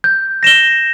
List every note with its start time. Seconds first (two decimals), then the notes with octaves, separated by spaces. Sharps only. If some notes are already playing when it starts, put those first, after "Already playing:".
0.04 G6
0.43 A#6 E7 G7